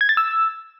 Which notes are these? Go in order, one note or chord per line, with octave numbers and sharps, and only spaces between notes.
G#6
A6
E6